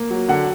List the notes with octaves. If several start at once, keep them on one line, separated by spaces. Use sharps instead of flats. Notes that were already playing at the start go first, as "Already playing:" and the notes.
Already playing: A#3
F#3
D3 F#5